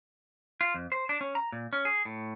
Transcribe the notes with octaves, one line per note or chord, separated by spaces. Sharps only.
F4
F2
C5
D4
C#4
A#5
A#2
C#4
G#4
A2